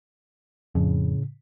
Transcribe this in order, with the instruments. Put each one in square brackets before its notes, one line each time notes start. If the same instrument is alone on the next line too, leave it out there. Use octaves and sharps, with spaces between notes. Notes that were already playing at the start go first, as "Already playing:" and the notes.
[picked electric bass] F2 [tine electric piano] A2 C#3